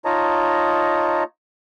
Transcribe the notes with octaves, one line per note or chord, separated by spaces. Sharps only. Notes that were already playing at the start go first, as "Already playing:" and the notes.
D#4 F4 C#5 D#5 A5 A#5